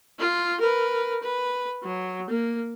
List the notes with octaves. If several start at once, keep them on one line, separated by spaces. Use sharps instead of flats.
F4
A#4 B4
B4
F#3
A#3